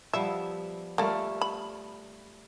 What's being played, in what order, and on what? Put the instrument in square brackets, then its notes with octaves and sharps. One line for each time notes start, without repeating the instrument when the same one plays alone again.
[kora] F3 G3 B3 [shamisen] E5
[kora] G3 A3 F4 [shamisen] A#3 A4
[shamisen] B5